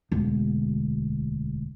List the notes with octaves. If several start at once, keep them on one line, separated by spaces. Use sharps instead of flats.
E1 D2